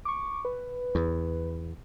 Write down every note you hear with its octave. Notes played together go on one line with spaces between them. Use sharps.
C#6 D6
B4
E2